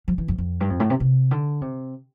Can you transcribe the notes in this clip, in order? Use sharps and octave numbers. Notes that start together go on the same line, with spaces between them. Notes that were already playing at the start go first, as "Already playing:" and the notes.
F3
E3
F2
F2
G2
F2
A2
C3
C3
D3
C3